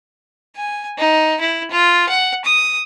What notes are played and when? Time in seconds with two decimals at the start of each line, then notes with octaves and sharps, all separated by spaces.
0.56 G#5
0.98 D#4
1.41 E4
1.71 F4
2.09 F#5
2.45 D#6